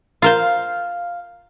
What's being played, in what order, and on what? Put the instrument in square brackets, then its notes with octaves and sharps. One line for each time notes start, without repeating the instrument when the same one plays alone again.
[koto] F4 A#4 C5 [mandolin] F5